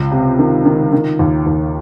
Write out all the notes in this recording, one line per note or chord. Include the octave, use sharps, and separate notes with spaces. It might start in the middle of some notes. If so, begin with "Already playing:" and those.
Already playing: C#2
C3
D#3
D#3
D#3
D#2
D#2